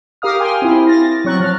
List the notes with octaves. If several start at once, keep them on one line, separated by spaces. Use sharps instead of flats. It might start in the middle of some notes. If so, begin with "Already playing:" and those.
G4 A#4 F5 D#6 F6
G5 G#5 C6 F6
C4 E4
A6 A#6
F#3 C4 C#6 F#6
F3 F6 A6